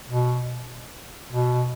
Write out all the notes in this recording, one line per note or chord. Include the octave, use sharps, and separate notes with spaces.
B2
B2